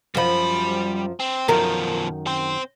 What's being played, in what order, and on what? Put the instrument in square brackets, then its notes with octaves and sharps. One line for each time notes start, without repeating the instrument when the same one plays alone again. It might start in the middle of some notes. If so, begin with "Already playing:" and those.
[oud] F#2 F3 [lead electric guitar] G3 B5
[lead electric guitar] C4
[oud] F#2 D#3 A#4 [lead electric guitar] B2 F3
[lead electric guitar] C4 C5